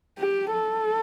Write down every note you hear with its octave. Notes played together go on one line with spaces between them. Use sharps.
G4
A4